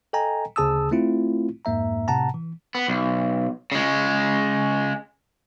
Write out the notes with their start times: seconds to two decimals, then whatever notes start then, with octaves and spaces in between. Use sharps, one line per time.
0.13 A4 D#5 G5 G#5 A#5
0.56 D2 C#3 G#4 A5 D#6 E6
0.91 A3 C4 E4 F4
1.65 F2 G#2 A#3 E5 A#5
2.08 A2 C3 F#5 A5 A#5
2.34 E3
2.75 B3
2.88 B1
3.72 C#3 G#3